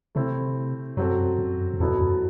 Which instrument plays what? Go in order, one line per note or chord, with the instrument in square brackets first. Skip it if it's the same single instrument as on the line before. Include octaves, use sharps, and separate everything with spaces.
[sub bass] C3 [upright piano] A3 C4 E4
[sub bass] F#2 [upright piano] F#3 C4 F#4 A4
[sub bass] F#2
F#2
[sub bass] E2 [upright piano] B2 F#3 B3 E4 A4
[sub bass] F#2